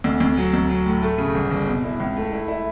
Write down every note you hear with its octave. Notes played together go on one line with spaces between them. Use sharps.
D2
D2
F#3
D2
F#3
A2
A3
C#3
G1
G1
B2
E4
C#2
A3
E4
E4